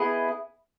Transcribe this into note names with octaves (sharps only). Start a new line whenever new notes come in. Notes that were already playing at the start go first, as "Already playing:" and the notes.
Already playing: B3 E4 G#4 D#5